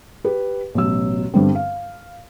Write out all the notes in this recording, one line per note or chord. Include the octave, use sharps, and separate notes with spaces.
G4 B4
A1 B2 F#3 E6
G2 D3 G3 B3 C4
F5